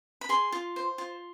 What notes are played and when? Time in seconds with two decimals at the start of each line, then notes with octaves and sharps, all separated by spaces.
0.21 B5
0.29 G#4 C6
0.52 F4
0.76 C5
0.98 F4